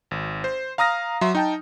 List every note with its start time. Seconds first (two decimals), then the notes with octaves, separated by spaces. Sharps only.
0.11 G#1
0.44 C5
0.78 F5 A#5 D#6 F6 A#6
1.21 F#3 E5 A#5 C6
1.35 D#4 G5 A5